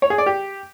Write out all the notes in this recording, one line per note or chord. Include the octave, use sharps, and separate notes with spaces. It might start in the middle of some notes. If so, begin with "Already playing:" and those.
C#5
G#4
D5
G4